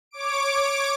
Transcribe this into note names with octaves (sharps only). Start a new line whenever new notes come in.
C#5 D6 D7